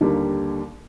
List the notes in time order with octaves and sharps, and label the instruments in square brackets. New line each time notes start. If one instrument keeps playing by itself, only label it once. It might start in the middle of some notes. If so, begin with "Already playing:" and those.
[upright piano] D#2 D3 G3 A#3